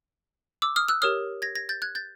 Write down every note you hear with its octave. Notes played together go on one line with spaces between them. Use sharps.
D6 E6
D#6 F6
E6 F#6
G4 A#4 C#5 D#6 F6
G#6 A#6
G#6 A#6
G6 A6
F#6 G#6
G6 A6